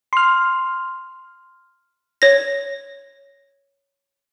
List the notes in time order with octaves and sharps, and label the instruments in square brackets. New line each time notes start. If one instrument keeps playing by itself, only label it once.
[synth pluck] C6 F6
[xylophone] C#5 A#6